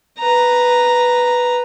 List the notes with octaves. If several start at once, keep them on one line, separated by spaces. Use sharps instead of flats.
B4 A#5